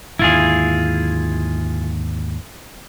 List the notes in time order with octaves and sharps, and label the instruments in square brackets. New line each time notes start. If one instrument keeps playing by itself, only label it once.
[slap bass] D#2 G#2 D3 [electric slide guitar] E4 F4 G#4